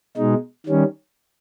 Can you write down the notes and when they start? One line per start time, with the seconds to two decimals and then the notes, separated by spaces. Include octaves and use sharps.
0.17 B2 G#3 D#4
0.66 D#3 G3 C#4